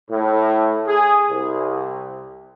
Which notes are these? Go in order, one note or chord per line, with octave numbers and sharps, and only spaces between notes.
A2
G#4
C2